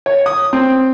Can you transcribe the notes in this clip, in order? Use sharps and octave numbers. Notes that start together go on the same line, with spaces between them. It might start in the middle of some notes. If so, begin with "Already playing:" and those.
C#5
D#6
C4